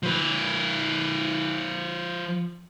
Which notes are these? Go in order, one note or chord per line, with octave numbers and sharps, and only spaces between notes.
F3 B4